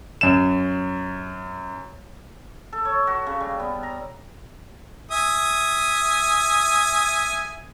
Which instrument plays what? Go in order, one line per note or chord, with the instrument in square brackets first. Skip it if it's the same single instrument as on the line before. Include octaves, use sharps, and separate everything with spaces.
[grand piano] F#2 E7
[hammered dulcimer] A4
C#5
F#4
C#3
G3
B3
A#5
[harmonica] E5 G#5 D#6